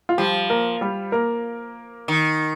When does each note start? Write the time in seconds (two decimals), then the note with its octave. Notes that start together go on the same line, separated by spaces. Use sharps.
0.09 F4
0.18 F3 G3 G4
0.50 A#3 A#4
0.81 G3 G4
1.12 A#3 A#4
2.08 D#3